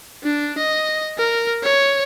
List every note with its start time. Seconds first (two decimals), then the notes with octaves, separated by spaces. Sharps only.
0.23 D4
0.58 D#5
1.18 A#4
1.63 C#5